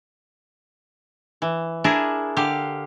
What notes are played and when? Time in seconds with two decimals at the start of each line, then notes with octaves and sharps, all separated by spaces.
1.42 E3
1.84 D4 E4 G#4 A#4
2.36 D3 G4 F5